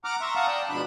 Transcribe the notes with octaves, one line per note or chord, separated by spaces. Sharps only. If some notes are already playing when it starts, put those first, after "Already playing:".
F#5 A#5 D6 F6
E5 A#5 C6 C#6
F5 F#5 A5 A#5 C#6 D#6
D5 G5 A5
G#2 B2 F3 D4 B5 F#6